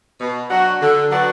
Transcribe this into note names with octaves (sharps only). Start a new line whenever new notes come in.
B2
F#3 D4 F#4
D3
F#3 B3 D4 F#4